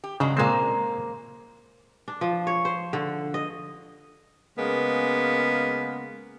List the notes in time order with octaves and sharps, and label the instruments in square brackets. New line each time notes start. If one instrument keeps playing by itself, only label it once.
[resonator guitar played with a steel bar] G4
[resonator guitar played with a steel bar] G2 F#3 G#3 [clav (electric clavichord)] C#3
[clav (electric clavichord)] A#2 G#3 C4 [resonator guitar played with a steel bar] A#3 C5
[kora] D4
F3
C#5
C5
D3
D#5
[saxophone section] C#3 G#3 A#3 B3